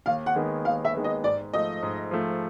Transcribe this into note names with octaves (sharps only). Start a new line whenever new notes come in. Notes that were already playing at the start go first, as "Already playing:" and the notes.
D#2 F5
F#5
D#3 G#3 B3
D#2 F5
E5
D#3 G#3 B3
D#5
G#2 D5
F3 A3 D#5
G#2
F3 A3